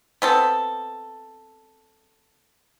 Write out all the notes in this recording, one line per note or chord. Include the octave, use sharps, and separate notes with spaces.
B3 C4 A4